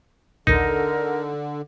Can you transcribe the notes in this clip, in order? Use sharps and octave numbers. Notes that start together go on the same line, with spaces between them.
A#1 D#2 D3 D#4 A#4 A#6